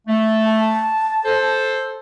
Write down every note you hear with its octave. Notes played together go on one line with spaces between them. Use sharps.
A3
A5
A4 C5